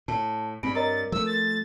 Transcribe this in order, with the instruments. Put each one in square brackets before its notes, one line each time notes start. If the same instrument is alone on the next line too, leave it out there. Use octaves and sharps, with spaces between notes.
[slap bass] A2 [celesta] A5
[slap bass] G2 [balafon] C4 [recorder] B5 [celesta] D7
[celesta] A#4 [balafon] C#5 D#5 A#5 [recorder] A6
[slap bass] F3 A3 [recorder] E6
[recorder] A6